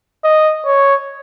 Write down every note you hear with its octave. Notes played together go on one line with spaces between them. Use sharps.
D#5
C#5